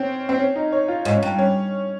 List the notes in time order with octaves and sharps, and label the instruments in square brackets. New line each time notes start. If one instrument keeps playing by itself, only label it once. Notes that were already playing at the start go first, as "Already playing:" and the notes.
Already playing: [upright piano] C4 C#4
C4
C#4
D#4
C#5
F4
[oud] G#2
[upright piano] C#4
[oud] G2
[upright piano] C#4